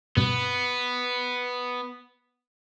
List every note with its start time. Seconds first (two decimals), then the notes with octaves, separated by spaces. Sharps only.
0.17 G2 B2 B3